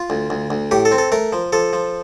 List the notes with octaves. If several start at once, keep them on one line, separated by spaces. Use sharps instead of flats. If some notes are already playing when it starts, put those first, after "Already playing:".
Already playing: F4
D2
D2
D2
A2 G4
A4
C4
A4
A3 A#4
F3
F3 A4
F3